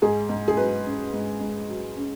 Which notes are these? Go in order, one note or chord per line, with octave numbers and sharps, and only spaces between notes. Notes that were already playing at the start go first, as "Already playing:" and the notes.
G#2 G#4
G#2
G#4
F#3 B4
C#4
G#2
G#2
F#3
C#4